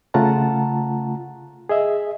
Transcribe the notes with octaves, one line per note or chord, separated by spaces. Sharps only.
C#3 A3 F4 F#5 A5 A#5
G#4 D#5 E5